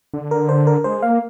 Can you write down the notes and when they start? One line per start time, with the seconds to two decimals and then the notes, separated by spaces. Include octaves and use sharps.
0.14 D3
0.31 A#4
0.49 C5
0.67 A#4
0.84 G#3 C5
1.02 A#3 F5